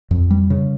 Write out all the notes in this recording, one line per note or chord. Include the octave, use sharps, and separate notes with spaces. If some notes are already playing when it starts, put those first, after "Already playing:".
F2
G3
C#3